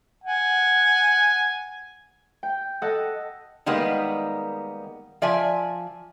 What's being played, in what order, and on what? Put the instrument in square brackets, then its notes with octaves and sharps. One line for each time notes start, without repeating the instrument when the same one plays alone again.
[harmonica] F#5 G#5
[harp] G5
A4 D#5 F#5
[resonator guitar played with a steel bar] D#3 G3 G#3 A#3 B3
F3 D5 E5 G#5